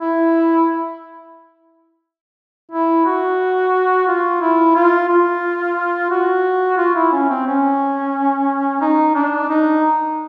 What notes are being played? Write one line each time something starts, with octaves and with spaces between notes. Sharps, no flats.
E4
E4
F#4
F4
E4
F4
F4
F#4
F4
E4
C#4
C4
C#4
D#4
D4
D#4